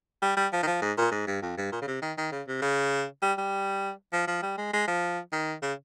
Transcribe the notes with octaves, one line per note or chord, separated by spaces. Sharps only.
G3
G3
F3
D#3
F3
G#2
A#2
G#2
G2
F2
G2
A#2
C#3
C3
D#3
D#3
C#3
C3
C#3
G3
G3
F3
F3
G3
G#3
G#3
F3
D#3
C#3